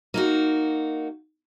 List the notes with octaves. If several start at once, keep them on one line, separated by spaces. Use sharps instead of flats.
A#3 D#4 F#4